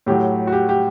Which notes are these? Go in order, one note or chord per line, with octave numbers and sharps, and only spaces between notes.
A2 F#3 G4
F#4
G4
G4